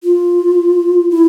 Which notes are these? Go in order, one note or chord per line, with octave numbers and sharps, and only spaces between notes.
F4
E4